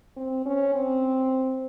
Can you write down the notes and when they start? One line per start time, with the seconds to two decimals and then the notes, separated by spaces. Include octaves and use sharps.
0.17 C4
0.46 C#4
0.75 C4